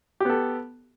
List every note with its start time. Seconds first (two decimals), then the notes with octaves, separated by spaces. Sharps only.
0.20 G4
0.25 B3
0.30 A4